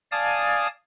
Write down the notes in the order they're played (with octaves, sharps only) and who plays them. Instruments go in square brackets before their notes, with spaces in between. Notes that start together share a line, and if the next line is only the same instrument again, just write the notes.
[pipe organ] D5 F5 G#5 A5 D#6